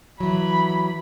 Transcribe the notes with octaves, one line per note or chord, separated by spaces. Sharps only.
E3 F#3 B5